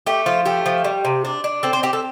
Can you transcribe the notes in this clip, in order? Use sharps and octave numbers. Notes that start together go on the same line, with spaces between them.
A3 G4
F3 F4
A3 G4
F3
G3
C3
D4
D4
C4 A4
C5
C4 G4
A4